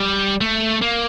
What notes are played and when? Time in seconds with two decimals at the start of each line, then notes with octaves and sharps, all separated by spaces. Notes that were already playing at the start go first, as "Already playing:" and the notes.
Already playing: G3
0.41 A3
0.82 A#3